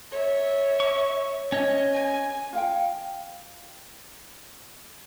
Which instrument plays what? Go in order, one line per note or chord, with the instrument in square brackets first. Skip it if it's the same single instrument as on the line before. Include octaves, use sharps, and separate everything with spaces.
[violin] C#5 E5
[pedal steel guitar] C#6
C#4 C#5 D#5
[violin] G#5
[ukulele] F4 F5 G5